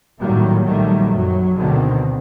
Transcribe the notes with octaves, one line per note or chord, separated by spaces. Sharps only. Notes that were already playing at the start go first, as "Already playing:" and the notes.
A2 D#3 F#3 G3 A#3
A#1 A#2 D#3 F#3 G3 A3
F#2 F#3
D2 B2 D3 D#3 C4